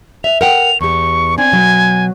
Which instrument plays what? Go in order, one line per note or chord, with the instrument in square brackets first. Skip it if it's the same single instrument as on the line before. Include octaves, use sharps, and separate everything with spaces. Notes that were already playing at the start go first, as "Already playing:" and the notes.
[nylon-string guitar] E5 [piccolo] F7
[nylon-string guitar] A#4 F#5 G5 [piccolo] F7
[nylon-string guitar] E2 G4 [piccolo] C#6
[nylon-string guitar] C4 D4 [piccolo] G#5
[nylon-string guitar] B2 F#3